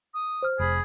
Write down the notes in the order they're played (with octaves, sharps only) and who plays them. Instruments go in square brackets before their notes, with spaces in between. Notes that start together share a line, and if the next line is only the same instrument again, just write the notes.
[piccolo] D#6
[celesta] C5 F6
[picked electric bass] F1 [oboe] G#4 [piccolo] B5